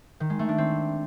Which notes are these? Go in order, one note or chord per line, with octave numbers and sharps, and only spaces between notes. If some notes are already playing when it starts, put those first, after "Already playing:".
D#3
G#3
A3
D4
C4